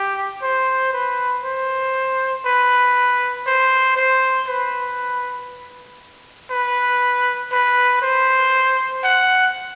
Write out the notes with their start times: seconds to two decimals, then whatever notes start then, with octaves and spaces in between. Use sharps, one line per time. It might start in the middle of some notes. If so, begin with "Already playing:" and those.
Already playing: G4
0.42 C5
0.93 B4
1.44 C5
2.46 B4
3.46 C5
3.97 C5
4.48 B4
6.50 B4
7.52 B4
8.02 C5
9.04 F#5